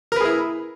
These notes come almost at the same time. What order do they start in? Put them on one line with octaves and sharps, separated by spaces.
A#4 B4 G#4 E4